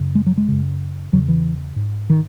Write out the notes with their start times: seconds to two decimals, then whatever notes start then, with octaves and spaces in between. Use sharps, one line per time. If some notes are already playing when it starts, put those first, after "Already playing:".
Already playing: F#2 C#3
0.15 G#3
0.26 F#3
0.38 G#3
0.48 F#2 C#3
1.13 E2 C#3 F#3
1.28 E3
1.76 G#2
2.10 D#3